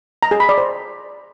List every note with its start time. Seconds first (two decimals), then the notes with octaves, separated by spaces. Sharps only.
0.23 A#5
0.31 G#4
0.40 B5
0.49 D5
0.58 C5